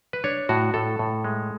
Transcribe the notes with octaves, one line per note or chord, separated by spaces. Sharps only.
B4
D4 C#5
A2 F#4
A2 A4
A2
G#3